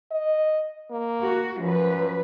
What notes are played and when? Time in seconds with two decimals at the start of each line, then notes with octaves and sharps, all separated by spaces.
0.11 D#5
0.91 A#3
1.22 F#4
1.59 F#2 F3 B4